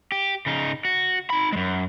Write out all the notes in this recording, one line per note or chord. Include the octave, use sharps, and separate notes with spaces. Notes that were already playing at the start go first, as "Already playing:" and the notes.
G4
C#3 D#4
F#4
D#4 B5
F#2 G#3